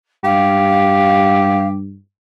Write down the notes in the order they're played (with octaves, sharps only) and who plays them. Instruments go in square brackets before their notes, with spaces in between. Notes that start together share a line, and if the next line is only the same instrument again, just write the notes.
[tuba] G2 [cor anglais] G4 [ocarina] F5